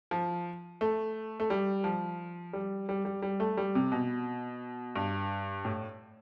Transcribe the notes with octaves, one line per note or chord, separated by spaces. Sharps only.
F3
A3
A3
G3
F3
G3
G3
G3
G3
A3
G3
C3
B2
G2
A2